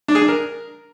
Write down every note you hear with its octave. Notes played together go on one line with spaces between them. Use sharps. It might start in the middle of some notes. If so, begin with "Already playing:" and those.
D4
G#4
D4
A#4